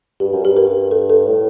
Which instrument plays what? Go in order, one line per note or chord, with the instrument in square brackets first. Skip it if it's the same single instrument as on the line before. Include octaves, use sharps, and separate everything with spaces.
[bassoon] G2 [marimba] G4
[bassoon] F#2
[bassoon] G2 [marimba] G4
[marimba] A#4
A4
A4
[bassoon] A2